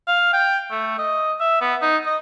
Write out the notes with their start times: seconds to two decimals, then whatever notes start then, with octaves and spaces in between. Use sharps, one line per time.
0.07 F5
0.33 G5
0.70 A3
0.98 D#5
1.40 E5
1.61 B3
1.81 D#4
2.06 D#5